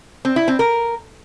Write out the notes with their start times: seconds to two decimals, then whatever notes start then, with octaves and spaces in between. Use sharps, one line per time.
0.25 C4
0.36 E4
0.48 C4
0.59 A#4